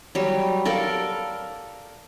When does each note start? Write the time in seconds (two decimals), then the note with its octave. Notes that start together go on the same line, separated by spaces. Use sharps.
0.15 F#3 G3
0.65 A4 A#4 D5 F5